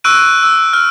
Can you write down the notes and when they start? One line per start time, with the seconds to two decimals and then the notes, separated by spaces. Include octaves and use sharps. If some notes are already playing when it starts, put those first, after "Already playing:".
0.04 C#6 E6 F#6 D7 D#7
0.43 E6
0.73 F6